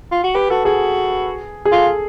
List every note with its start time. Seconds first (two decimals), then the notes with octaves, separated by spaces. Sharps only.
0.12 F4
0.23 F#4
0.35 G4 B4
0.50 F#4 A4
0.65 F#4 G#4
1.65 G#4
1.72 F4 A4